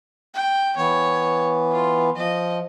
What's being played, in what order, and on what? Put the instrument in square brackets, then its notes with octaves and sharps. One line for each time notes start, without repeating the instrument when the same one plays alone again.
[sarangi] G5
[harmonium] E3 B3 [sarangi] C#5
[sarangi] F4
[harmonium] F3 [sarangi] D#5